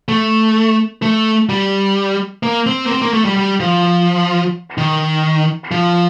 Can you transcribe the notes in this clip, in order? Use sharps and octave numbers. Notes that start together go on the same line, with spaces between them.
A3
A3
G3
A#3
C4
A#3
C4
A#3
A3
G3
G3
F3
D#3
F3